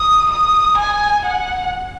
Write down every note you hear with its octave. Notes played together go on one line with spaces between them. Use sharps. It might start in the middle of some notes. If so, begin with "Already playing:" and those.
Already playing: D#6
D#6
G#5
F#5